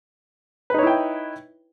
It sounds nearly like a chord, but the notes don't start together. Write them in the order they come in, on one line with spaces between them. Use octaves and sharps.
B4 D#4 C#5 E4 G5